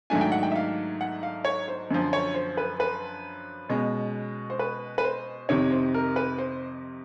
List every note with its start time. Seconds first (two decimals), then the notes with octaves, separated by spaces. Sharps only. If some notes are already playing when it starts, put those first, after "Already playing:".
0.10 G#2 D#3 F#3 A3 D4 G#5
0.21 G5
0.32 F#5
0.43 G5
0.52 E5
0.56 F5
1.01 F#5
1.23 F5
1.45 C#5
1.68 C5
1.91 F#2 D3 F3
2.13 C#5
2.35 C5
2.57 B4
2.80 B4
3.69 B2 G#3 C#4
4.50 C5
4.59 B4
4.98 B4
5.04 C5
5.49 F2 C3 D#3 C#5
5.71 C5
5.94 A#4
6.16 B4
6.38 C5